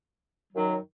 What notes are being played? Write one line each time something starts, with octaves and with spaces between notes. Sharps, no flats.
F#2 D#3 F#3